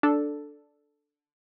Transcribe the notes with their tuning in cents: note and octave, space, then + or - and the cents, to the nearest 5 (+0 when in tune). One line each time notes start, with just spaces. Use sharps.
D4 +0 A4 +0